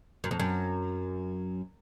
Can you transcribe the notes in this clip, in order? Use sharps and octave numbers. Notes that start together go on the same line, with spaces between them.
F#2
F2
F#2